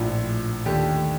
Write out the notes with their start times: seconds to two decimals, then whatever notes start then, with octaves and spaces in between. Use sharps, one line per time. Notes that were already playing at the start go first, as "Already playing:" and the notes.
Already playing: A#1 A2 F3
0.66 D#2 D3 A3 G4